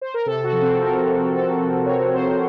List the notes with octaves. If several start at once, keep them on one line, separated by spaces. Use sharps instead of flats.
C5
A#4
C3 A4
F#4
F3
C4
C3 A#4
F3
C3 A4
F3
C3 C#5
F3 C5